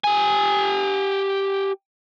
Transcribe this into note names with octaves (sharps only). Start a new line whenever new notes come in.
G4 G#5